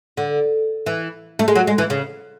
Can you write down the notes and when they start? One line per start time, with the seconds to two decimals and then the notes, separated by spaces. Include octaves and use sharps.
0.17 D3
0.86 E3
1.39 A3
1.48 G#3
1.56 F#3
1.67 G#3
1.78 E3
1.90 C#3